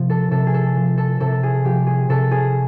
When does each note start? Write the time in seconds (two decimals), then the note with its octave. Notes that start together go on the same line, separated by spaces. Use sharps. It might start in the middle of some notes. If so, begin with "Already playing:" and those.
Already playing: C3 F3
0.10 A4
0.31 C3 A4
0.47 G#4
0.54 A4
0.76 F3
0.98 A4
1.20 C3 A4
1.43 G#4
1.64 F3 G4
1.87 G#4
2.09 C3 A4
2.31 G#4